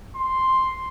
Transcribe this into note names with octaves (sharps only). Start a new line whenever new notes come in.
C6